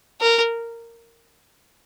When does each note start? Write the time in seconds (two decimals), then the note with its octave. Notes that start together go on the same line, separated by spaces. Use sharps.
0.21 A#4